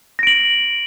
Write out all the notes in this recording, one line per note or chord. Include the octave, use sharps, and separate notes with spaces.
A#6 D7 F#7